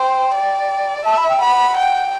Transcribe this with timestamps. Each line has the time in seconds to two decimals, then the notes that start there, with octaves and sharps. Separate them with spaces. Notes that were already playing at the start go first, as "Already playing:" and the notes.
Already playing: C5 G5
0.34 D5
1.05 E5 A5
1.18 B5
1.29 G5
1.41 F#5 B5
1.77 G5